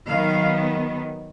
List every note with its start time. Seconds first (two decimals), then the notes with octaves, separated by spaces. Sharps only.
0.09 D#3 F#3 B3 F5